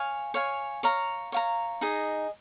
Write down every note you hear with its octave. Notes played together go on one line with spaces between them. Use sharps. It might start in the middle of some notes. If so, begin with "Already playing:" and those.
Already playing: C#5 F5 G#5
C#5 F5 G#5
C#5 F5 A#5
C#5 F5 A#5
D#4 G#4 D#5